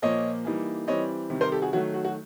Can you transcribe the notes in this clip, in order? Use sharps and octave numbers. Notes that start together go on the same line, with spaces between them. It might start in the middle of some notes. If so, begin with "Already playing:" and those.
A#2 F3 A#3 C#5 D#5
E3 G3 A#3 D#4
E3 G3 C4 C#5 D#5
C3 D#3 G3
A#4 C5
G4 A4
F#4 G#4
D#3 F#3 A3 F#4
F#4
F#4